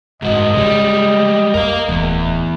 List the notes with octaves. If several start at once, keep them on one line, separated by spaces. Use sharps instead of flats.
F#1 G#2 D3 F#4 D#5
C#3 G3 G#3
F2 A#4 F5
D1 E2